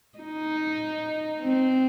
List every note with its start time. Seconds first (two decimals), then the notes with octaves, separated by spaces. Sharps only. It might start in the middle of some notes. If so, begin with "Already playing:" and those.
0.19 D#4
1.42 C4